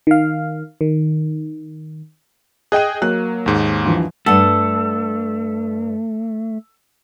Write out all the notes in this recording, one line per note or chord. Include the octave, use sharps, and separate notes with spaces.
D#3 F5
D#3
G#4 D#5 G5 F#6 D#7
F#3 A#3 F#6
D#2 G#2
G2 E3 F3
G2 A3 A4 F#5